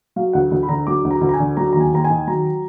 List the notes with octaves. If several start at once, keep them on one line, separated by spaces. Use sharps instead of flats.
F#3 F5
D2 F#5
D2
B5
D3 A#5
F#3 D6
D2
A#5
D2
A#5
G#5
D3
F#3 A#5
D#2 A#5
G#5
D#2 A#5
G#5
D#3
F#3 A#5